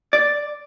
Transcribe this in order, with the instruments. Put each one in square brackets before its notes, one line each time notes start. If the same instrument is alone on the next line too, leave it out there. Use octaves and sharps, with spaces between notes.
[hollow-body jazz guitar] D5